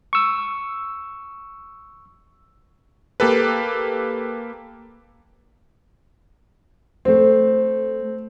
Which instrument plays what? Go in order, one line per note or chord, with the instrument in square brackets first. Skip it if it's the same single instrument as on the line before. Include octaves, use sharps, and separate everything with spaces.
[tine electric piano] C#6 E6
[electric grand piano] A#3 G4 A4 B4
[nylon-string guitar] A3 C5 [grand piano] C4